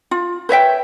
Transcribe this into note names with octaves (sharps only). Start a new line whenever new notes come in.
F4
B4 C#5 E5 G5